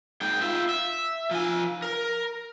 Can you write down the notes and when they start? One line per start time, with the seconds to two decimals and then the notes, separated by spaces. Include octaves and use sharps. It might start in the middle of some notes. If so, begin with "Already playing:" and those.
0.21 G#2 G5
0.41 F4 E5
0.69 E5
1.31 F3 G#5
1.82 A#4